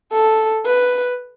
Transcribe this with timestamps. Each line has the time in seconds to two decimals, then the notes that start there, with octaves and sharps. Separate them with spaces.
0.12 A4
0.65 B4